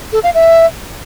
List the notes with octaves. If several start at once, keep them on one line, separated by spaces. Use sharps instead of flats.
A4
F5
E5